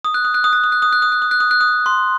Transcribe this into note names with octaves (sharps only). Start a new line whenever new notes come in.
D#6
F#6
D#6
F#6
D#6
F#6
D#6
F#6
D#6
F#6
D#6
F#6
D#6
F#6
D#6
F#6
D#6
C6